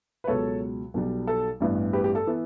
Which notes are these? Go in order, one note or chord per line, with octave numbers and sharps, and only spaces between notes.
B4
C#2 B2 F#3 A4 C#5
B1 B2 G3
A4
A1 G2 E3 B3
G4 B4
G4
A4
E3 B3